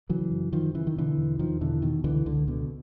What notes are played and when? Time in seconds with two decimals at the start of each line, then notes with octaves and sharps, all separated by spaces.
0.09 C#3 E3 F#3
0.31 F#2
0.52 F#2 D#3 F3
0.74 C#3 E3
0.87 D#3
0.96 B2 D3 E3
1.18 E2
1.39 E2 D#3 F3
1.61 B2 D3 E3
1.82 B2 D#3
2.04 C#2 D3 E3
2.26 C#2 D3
2.48 B2 D3